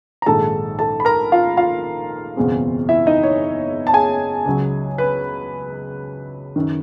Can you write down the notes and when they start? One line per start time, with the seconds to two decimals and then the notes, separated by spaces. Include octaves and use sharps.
0.22 A#5
0.26 A#1 G#2 D#3 G#3 A4 A5
0.79 A4 A5
1.00 B5
1.05 A#4 A#5
1.32 F4 F5
1.57 F4 F5
2.36 F#1 E2 B2 G#3 C4
2.89 E4 E5
3.07 D#4 D#5
3.23 C#5
3.87 A5
3.93 G#4 G#5
4.45 C#2 C#3 F#3
4.98 B4 B5
6.56 F#2 D#3